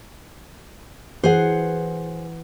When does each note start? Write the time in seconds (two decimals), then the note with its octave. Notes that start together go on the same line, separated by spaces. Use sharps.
1.24 E3 G#4 C5 F#5